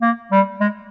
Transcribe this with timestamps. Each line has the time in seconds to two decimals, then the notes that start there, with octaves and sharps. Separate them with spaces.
0.01 A#3
0.31 G3
0.60 G#3